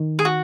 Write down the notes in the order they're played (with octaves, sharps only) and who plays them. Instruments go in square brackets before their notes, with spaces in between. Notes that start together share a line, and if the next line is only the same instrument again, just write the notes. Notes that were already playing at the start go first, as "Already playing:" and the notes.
Already playing: [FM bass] D#3
[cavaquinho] G#4
F#4